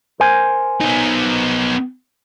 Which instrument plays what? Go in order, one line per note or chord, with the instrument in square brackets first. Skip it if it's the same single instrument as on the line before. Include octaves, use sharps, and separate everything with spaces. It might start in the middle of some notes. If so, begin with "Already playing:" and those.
[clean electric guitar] A#4 C5 G#5
[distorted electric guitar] B3 D#4